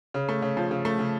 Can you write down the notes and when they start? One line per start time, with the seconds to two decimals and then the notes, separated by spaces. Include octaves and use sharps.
0.14 C#3
0.29 A3
0.42 C#3
0.57 F3
0.71 C#3
0.85 A3
0.99 C#3